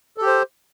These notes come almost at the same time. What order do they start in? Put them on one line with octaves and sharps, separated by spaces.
A4 G4 C5